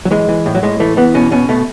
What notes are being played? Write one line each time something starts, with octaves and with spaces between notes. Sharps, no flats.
F#3
E3 G#3
E3
A2
F#3
A2 G#3
E3 A3
E3 B3
B2 C#4
B2 C#4
B2 A3